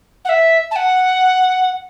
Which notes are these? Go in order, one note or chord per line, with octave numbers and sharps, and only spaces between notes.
F#5
E5
A5
F#5